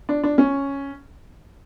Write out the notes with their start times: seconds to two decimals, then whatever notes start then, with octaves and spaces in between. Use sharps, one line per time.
0.09 D4
0.24 D4
0.38 C#4